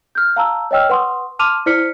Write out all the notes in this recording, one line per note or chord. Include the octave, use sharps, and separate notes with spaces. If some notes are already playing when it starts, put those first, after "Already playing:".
F6 G6
F5 A5 A#5 E6
C#5 D#5 G5 E6 F6
B4 F#5 C6 C#6 D#6
A5 C6 D6 F6 D#7 F7
E4 C5 D5 F6 B6 C#7